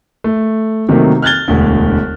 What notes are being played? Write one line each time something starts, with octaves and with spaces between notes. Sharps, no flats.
A3
C3 D#3 F#3 A3 A#3
F6 F#6 G#6 A6 G7
E1 D2